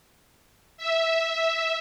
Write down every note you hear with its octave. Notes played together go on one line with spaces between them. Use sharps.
E5